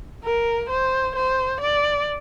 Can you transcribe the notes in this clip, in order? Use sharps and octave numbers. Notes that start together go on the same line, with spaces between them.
A#4
C5
C5
D5